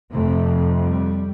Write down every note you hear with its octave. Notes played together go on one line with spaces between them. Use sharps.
F2 C3 A3
G3